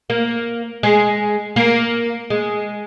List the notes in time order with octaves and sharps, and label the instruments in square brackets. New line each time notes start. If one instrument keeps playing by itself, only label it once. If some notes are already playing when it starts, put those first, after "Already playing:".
[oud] A#3
G#3
A#3
G#3